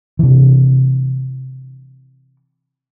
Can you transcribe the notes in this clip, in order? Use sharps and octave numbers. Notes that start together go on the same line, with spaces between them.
C3 E3